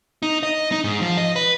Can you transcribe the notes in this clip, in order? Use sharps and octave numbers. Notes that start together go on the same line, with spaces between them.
D#4
D#5
D#4
G#2
F3
D#5
B4